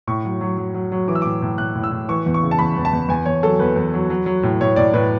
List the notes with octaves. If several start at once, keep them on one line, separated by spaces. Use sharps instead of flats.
A2 C#6
F#3
F#3
F#3
F#3
F#3
E3 D6
E6
A2 D6
A2
A2 F#6
A2
E6
A2
E3 C#6
E2
C#6
C#3
A5
E2 B5
E2
A5
E2
E2 G#5
E2 C#5
F#3 A4
E2 B4
E2
F#3
F#3
F#3
A2
A2 C#5
A2 D5
A2 B4